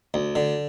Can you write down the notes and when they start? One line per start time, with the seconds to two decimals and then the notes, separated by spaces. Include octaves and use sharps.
0.14 D2
0.35 D3